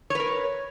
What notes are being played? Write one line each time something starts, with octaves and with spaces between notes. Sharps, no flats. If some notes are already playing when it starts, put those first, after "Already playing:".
A#4 B4 C#5